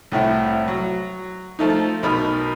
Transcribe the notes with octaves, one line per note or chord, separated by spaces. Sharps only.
C2 A2 E4
F#3
F3 A3 D#4
B1 B2 D#4 A#4 B5